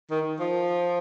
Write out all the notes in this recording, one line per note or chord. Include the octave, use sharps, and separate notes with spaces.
D#3
F3